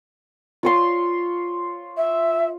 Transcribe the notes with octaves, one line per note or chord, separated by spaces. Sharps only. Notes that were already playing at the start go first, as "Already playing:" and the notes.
F4 C#5 C6
E5